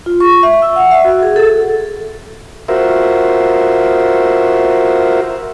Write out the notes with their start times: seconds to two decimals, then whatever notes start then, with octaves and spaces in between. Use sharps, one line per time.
0.06 F4
0.20 C#6
0.43 E5
0.62 E6
0.76 F#5
0.91 E5
1.05 F#4
1.23 G#4
1.36 A4
2.68 F4 F#4 A#4 C5 E5